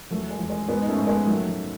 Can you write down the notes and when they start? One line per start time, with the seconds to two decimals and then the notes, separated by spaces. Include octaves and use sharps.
0.11 E2 F#3 A3
0.30 G#3
0.39 E2
0.50 G#3
0.68 G#2 G#3 B3
0.81 D#4
0.88 A3 C#4
0.98 G#2
1.07 G#3 B3
1.26 D#3 F#3 A3
1.47 F#3